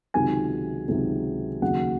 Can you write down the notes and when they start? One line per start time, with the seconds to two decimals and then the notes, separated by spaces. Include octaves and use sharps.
0.14 C#2 C3 D#3 F#3 G#5
0.88 C#2 C3 D#3 F#3
1.62 D#2 C#3 F#3 F#5